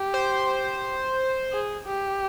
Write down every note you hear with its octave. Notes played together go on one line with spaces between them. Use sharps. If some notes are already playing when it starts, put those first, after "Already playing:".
Already playing: G4
C5
G#4
G4